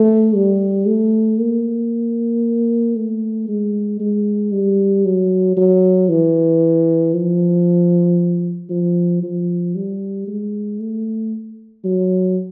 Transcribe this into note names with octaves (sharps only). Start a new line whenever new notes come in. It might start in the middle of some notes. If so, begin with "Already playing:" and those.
Already playing: A3
G3
A3
A#3
A3
G#3
G#3
G3
F#3
F#3
E3
F3
F3
F3
G3
G#3
A3
F#3